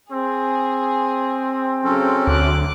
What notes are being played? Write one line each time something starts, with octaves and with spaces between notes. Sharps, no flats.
C4 G#4
C#3 F#3 C#4 A4
D2 D6 F#6